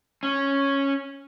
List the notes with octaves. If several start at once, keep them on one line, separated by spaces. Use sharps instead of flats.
C#4